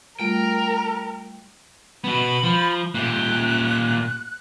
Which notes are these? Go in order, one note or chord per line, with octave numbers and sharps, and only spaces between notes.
G3 A3 F4 A#4 G5
B2 B3 B5
F3
A#2 G4 F#6